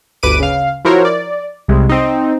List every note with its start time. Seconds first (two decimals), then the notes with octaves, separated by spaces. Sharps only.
0.23 G1 D2 B4 D6 D7 D#7
0.39 C#3 F5
0.85 F3 E4 F#4 A#4 C5 C#5
1.05 D5
1.68 C2 C3 G#3
1.89 C4 D#4